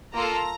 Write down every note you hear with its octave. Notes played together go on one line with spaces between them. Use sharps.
A#3 F4 A4 A#5